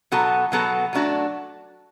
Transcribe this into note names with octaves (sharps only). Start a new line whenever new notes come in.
B2 F#3 B3 F#4 A4
B2 F#3 B3 F#4 A4
F#3 A3 D4 F#4